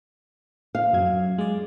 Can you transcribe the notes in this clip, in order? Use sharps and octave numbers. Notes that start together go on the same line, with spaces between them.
F5
F#2 F#3 G#6
G#3 D5